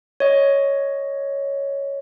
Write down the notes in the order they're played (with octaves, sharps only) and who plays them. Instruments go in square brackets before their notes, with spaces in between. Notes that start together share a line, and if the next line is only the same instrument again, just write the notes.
[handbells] C#5 D#5